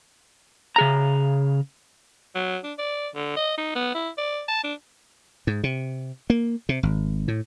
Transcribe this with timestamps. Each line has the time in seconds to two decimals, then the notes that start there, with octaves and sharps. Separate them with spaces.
0.76 C#3 G#4 A#5
2.35 F#3
2.64 D4
2.79 D5
3.15 D3
3.36 D#5
3.58 D#4
3.75 B3
3.95 E4
4.18 D5
4.48 A5
4.64 D4
5.47 G#2
5.64 C3
6.30 A#3
6.69 C3
6.83 G#1
7.28 A2